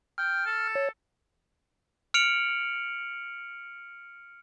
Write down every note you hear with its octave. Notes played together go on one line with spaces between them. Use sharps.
G5 F6
A4
C#5
F6 C#7 D7 F7 F#7